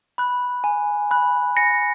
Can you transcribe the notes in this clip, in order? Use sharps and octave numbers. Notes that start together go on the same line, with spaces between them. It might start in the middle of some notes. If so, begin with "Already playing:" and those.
B5 F#6
G#5
B5 F#6
G#5 A#6 C#7